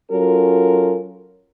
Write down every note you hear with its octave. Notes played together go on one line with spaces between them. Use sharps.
F#3 C#4 F4 F#4 A4 A#4